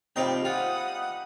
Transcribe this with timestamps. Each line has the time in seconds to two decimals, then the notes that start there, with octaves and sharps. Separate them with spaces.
0.16 C3 F3 G3 C4 D#4 G5
0.45 F4 F#5 D#6